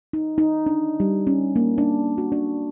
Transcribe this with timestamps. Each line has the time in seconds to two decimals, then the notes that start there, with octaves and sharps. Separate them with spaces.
0.13 D#4
0.38 D#4
0.66 D4
1.00 G3
1.27 C#4
1.56 A#3
1.78 D4
2.18 F#4
2.32 D4